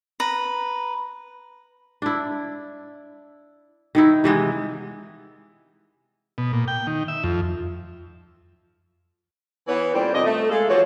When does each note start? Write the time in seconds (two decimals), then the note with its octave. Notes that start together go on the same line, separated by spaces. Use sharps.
0.20 B4 A#5
2.02 D4 E4
3.95 D#3 D#4 E4
4.24 C3 E3 G#3 B3
6.38 B2
6.53 A#2
6.68 G5
6.87 D#3
7.08 E5
7.24 F2
9.68 E3 B3 C#5
9.94 A#2 G3 C4 D4 A4 C5
10.14 F2 C3 D5 D#5
10.25 A3
10.50 G#3 A#3 A4
10.69 E3 F3 F#4 C5 C#5